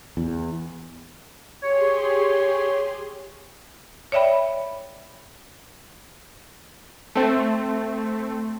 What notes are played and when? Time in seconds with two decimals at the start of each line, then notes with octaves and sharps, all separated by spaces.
0.17 E2
1.62 G4 G#4 C#5 C6
4.12 C#5 D5 E5 G5 B5
7.15 A3 C4